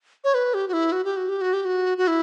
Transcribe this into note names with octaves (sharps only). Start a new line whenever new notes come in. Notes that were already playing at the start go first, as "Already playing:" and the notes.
C#5
B4
G4
F#4
E4
F#4
G4
F#4
G4
F#4
G4
F#4
F#4
E4